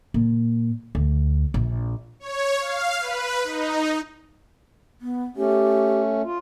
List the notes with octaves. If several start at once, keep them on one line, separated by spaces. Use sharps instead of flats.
A#2
D2
A#1
C#5
F5
B4
D#4
B3
A3 C#4 G4
F4